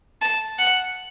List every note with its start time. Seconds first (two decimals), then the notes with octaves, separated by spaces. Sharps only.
0.22 A5
0.59 F#5